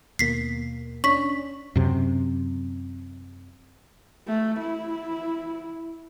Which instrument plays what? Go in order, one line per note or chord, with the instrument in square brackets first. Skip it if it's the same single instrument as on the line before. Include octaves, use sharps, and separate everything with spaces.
[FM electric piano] D#2 B2 A#3 [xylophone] B6 C7
[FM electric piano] C#4 D4 [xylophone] C#6 B6
[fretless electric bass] F#2 C3
[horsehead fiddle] A3
E4